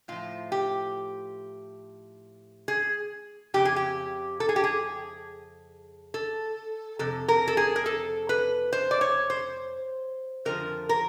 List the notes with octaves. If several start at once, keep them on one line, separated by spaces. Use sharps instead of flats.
A2 F3 F4
G4
G#4
F2 C#3 G4
G#4
G4
A4
G#4
G4
G#4
A4
F2 C3 A4
A#4
A4
G#4
A#4
A4
B4
C5
D5
C#5
C5
F2 D3 F3 A#4
A#4